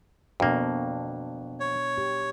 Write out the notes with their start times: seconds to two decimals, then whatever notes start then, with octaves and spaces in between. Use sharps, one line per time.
0.40 F2 B2 A#3 D4 F#4
1.60 C#5
1.98 G4